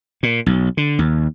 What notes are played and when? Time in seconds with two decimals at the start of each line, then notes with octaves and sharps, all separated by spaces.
0.23 A#2
0.46 B1
0.77 D3
0.99 D#2